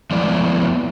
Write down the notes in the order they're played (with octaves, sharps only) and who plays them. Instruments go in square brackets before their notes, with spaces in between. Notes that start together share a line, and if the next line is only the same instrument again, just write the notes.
[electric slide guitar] F3 G#3 A3 B3 E4 D5